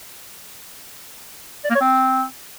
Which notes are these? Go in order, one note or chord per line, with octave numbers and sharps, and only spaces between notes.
D5
A#3
C#5
C4